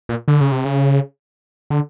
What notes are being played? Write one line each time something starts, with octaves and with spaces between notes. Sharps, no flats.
A#2
D3
C#3
C3
C#3
D3